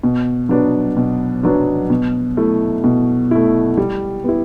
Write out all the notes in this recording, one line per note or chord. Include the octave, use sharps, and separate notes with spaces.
B2
F#3 B3 D4
B2
F#3 B3 D4
B2
A3 E4
B2
A3 E4
G3
B3 E4